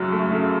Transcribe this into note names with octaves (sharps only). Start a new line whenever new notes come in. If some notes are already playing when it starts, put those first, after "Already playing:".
Already playing: F#2 C#3 F#3
A3
C#3